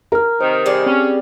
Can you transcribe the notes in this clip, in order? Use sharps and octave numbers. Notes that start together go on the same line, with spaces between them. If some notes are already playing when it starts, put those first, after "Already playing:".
A#4 A#5 F6
C3 D#3 C5
G3 G#4 D5
C4 C#4